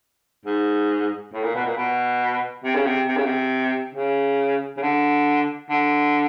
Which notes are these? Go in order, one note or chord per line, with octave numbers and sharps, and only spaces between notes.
G#2
A2
A#2
B2
A#2
B2
C3
C#3
C3
C3
C#3
C3
C#3
C#3
D3
D3